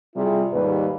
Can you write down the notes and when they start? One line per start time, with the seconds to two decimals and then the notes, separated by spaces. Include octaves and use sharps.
0.15 C3 G3 E4 F4 G#4
0.52 D#2 G#2 G3 B4